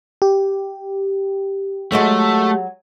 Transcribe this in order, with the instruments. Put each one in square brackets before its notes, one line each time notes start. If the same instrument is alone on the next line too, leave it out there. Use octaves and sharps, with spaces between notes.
[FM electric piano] G4
[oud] F#3 G#3 F#4 [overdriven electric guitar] A3